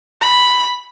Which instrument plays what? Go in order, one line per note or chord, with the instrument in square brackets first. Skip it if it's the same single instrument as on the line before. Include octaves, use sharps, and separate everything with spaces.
[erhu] B5